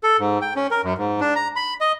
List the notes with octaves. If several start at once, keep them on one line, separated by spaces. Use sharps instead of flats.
A4
G#2
G5
C#4
A#4
F#2
G#2
D4
A#5
B5
D#5